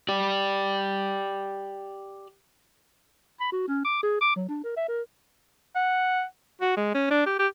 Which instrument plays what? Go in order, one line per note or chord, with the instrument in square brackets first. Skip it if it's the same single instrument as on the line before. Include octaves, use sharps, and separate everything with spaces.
[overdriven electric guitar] G4 D5
[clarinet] B5
F#4
C#4
D6
G#4
D6
F#3
D4
A#4
E5
A#4
[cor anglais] F#5
[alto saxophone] F#4
G#3
C#4
D4
G4
G4